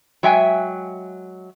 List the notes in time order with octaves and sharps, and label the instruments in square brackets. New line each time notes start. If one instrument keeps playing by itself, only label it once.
[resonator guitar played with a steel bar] F#3 G#3 E5 G5 G#5